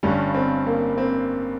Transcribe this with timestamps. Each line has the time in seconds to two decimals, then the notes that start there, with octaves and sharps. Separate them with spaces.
0.03 G1 G2 G3 C#4
0.35 C4
0.67 A#3
0.98 C4